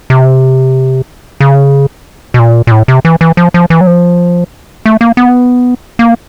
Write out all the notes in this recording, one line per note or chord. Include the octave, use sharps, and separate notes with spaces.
C3
C#3
B2
A#2
A#2
A2
C3
E3
E3
F3
F3
E3
F#3
F3
A3
A#3
B3
A#3